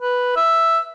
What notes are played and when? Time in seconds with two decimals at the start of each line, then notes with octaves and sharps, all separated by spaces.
0.01 B4
0.36 E5